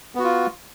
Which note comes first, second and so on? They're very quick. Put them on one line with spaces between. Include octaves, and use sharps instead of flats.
B3 F#4 F4